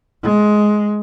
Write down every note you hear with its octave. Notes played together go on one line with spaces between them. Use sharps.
G#3